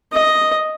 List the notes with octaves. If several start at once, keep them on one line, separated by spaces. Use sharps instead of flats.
D#5